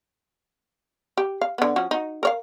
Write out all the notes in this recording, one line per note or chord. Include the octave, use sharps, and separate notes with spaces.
G4
F5
D3 B3
F3 C#4 F#4
D#4 F#4
A#4 C#5 F5